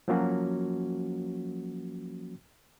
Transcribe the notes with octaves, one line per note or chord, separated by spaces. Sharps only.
F3 F#3 A#3 C#4 F#4